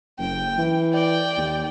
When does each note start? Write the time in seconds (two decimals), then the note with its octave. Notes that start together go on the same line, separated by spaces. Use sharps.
0.19 F#1 G5
0.58 E3
0.93 D5 G5
1.38 D#2